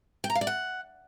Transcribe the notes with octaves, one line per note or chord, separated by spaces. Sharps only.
G5
A#5
F5
D5
F#5